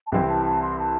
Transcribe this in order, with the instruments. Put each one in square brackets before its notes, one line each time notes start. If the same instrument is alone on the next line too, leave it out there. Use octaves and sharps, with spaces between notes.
[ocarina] A5
[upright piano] C2 C3 E3 C4 E4 [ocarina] G5
[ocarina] A5
A5
C6
A5